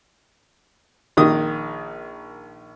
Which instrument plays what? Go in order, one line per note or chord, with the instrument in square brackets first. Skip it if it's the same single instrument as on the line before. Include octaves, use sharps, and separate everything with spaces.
[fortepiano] A#1 D#3 D#6